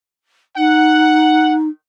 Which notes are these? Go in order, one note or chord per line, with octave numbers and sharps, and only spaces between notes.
D#4 F#5